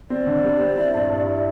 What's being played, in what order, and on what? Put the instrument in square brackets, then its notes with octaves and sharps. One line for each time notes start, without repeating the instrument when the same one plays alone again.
[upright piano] C4 [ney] D5
[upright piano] D3
G3
C4
E4
G2
G2
E4